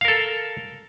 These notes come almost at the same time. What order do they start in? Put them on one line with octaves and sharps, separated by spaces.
F5 A#4 A4